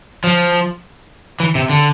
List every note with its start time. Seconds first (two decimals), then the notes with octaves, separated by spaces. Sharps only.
0.24 F3
1.40 E3
1.55 C3
1.69 D3